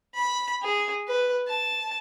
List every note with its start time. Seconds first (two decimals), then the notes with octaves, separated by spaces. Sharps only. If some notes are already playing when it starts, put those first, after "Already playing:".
0.14 B5
0.62 G#4
1.08 B4
1.47 A5